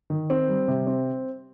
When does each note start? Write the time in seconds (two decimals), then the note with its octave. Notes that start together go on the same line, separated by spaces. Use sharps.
0.10 D#3
0.30 C4
0.48 G3
0.68 C3
0.87 C4